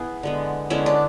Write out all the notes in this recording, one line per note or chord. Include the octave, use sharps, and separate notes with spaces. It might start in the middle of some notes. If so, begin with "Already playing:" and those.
Already playing: B3 E4 G#4
D3 G#3 B3
D3 G#3 B3 C#4 E4
D4